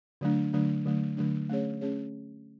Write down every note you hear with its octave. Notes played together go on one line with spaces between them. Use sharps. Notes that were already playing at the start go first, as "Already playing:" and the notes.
D3 F#3 A3 D4
D3 F#3 A3 D4
D3 F#3 A3 D4
D3 F#3 A3 D4
A3 C#4 G#4 C#5
A3 C#4 G#4 C#5